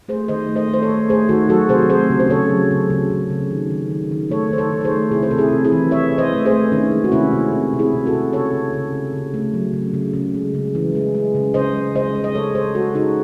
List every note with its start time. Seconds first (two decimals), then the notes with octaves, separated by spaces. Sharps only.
0.08 A3 G#4 C5
0.28 D#3 C5 D#5
0.49 A3
0.55 C5 D#5
0.69 A3
0.74 C5
0.82 A4 C#5
0.89 A3
1.09 A3 G#4 C5
1.29 D#3 F#4 A4
1.49 F#3 F#4 A4
1.69 C3 G#4 C5
1.89 A3 G#4 C5
2.10 C#3
2.20 C5
2.30 C#3 A4 C#5
2.49 F#3
2.71 C#3
2.90 C#3
3.10 C#3
3.30 C#3
3.51 D#3
3.71 D#3
3.91 D#3
4.11 D#3
4.30 A3 A4 C#5
4.51 D#3 C5
4.58 A4 C#5
4.71 D#3
4.81 C#5
4.84 G#4 C5
4.91 A3
5.11 C3 E4 G#4
5.23 C5
5.31 C3 A4
5.38 E4 G#4
5.52 C3
5.65 E4 G#4
5.72 E3
5.91 E3 C#5 E5
6.12 E3
6.18 C5 D#5
6.33 A3
6.46 G#4 C5
6.52 A3
6.72 D#3 C#4
6.92 G#3
7.04 F#4
7.12 C3 C#4 E4
7.33 C3
7.52 C3
7.73 C3
7.79 E4 G#4
7.93 C3
8.06 F#4 A4
8.13 C3
8.32 C#3 A4 C#5
8.54 C#3
8.73 C#3
8.93 C#3
9.13 C#3
9.34 A3
9.54 F#3
9.73 C#3
9.94 C#3
10.13 C#3
10.34 G#3
10.54 C#3
10.75 E3
10.95 G#3
11.15 G#3
11.35 C#3
11.54 C#3 C5 D#5
11.75 G#3
11.95 C#3 C5 D#5
12.15 G#3
12.24 D#5
12.35 G#3 A4 C#5
12.55 G#3 G#4 C5
12.75 G#3 F#4 A4
12.95 C#3 D#4 F#4